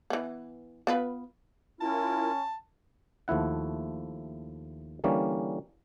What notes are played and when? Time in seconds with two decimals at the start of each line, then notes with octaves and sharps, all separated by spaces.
0.10 E3 B3
0.87 B3 F4 B4
1.81 C#4 E4 F4 A#4 A5
3.28 D#2 F3 A3 E4 F#5
5.04 D3 E3 G3 A#3 C#4